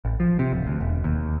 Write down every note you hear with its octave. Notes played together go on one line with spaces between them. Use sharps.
A1
F3
C3
D1
D2
E1
D#2